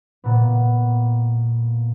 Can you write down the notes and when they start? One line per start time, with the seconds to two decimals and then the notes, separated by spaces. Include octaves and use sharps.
0.24 A#2 B3